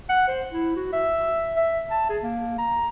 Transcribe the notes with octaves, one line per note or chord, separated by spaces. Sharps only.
F#5
C5
E4
F#4
E5
E5
A5
G#4
A#3
A#5